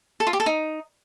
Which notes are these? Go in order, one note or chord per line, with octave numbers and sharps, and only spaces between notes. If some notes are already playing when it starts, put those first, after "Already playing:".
A4
F4
G4
A4
D#4